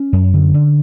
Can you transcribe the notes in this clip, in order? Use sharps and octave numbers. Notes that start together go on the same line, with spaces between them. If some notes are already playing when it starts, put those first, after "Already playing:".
Already playing: C#4
F#2
D3
D3